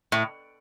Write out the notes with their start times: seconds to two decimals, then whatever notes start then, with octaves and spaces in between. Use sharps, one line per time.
0.12 A2